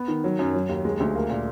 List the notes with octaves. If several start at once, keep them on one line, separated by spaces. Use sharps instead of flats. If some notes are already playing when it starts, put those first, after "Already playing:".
Already playing: B3
D#3
F#3
F#2
F#3
D#2
G#3
D2
A#3
A#2